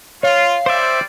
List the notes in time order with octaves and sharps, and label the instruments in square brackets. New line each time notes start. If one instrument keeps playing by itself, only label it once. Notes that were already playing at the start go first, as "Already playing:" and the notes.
[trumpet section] F4 [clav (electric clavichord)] C#5 [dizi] F5
[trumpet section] G3 C4 D5 [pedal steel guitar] C5 E5